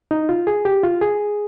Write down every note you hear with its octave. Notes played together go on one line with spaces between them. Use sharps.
D#4
F4
G#4
G4
F4
G#4